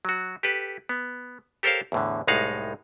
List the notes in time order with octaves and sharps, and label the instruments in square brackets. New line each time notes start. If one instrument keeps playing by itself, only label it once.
[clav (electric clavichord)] F#3 F#4
G4 A4 B4
B3
G4 A4 A#4 C5 C#5 F5
E2 A2 D3
C2 A2 G#3 D#4 F5 F#5